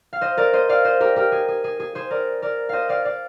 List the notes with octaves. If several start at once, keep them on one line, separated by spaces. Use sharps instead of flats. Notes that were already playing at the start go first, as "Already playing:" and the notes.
F5
C5 D#5
A#4 D5
C5 D#5
D5 F5
C5 D#5
G4 A#4
G4 A#4
G#4
G#4
G#4
G#4
G#4 C5
A#4 D5
A#4 D5
C5 D#5 F5
D5 F5
D5 F5